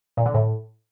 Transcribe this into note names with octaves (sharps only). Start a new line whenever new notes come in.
A#2
D3
A2